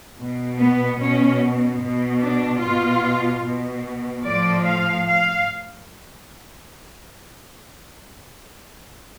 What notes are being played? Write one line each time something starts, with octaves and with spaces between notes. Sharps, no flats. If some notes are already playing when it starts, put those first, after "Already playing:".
B2
B3
B2 C#4
B2
D4
B2 F4
B2
A2 F3 D5
F5
F5